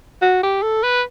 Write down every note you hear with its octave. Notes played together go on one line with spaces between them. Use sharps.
F#4
G4
A4
B4